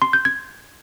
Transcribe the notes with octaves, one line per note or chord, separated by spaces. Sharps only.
C6
G6
G#6